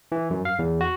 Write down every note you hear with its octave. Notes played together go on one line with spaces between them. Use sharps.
E3
F#2
F5
E2
F#4